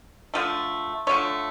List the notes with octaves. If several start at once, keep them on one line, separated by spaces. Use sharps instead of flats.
D3 F3 A3
D3 F3 A3 C#5